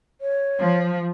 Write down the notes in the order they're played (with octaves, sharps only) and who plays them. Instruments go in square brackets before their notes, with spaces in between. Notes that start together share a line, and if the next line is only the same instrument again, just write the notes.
[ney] C#5
[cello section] F3